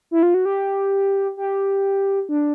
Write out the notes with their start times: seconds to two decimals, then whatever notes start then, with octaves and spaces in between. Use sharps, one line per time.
0.11 E4
0.23 F4
0.34 F#4
0.45 G4
1.37 G4
2.29 D4